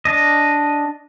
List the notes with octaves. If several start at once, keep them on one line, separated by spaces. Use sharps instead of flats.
D4 D#5